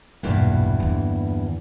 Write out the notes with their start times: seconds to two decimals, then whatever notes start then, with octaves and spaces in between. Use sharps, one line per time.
0.23 B1 E2 G2 A#2 E3
0.80 D#2 D3